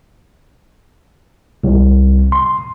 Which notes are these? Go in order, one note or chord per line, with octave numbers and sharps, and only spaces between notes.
C2
C6